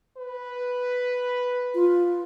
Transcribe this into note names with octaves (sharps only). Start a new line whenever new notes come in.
B4
F4